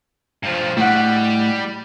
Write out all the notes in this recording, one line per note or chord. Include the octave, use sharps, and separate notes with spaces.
G2 F3
A2 G3 F#5